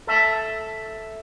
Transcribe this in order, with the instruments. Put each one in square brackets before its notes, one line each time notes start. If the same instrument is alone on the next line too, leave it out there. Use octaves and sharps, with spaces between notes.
[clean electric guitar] A4 E5 A5